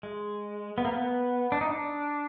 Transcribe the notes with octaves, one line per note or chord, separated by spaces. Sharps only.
G#3
B3
A#3
B3
D4
D#4
D4